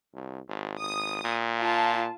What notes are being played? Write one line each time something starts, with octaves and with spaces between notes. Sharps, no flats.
C2
G#1
G#1 D#6
A#2
F4 A5